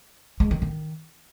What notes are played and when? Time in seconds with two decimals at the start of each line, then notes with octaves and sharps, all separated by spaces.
0.40 G#3
0.51 D#3
0.62 D#3